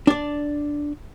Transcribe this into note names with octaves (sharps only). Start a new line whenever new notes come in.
D4 D5